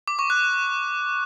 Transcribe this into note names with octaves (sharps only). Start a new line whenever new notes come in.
D6
C#6
F#6